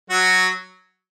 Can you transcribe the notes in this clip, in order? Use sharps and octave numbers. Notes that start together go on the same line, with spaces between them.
F#3 F#4